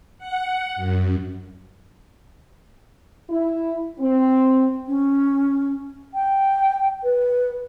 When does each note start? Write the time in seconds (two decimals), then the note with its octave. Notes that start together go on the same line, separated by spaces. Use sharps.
0.18 F#5
0.76 F#2
3.30 E4
3.99 C4
4.87 C#4
6.14 G5
7.03 B4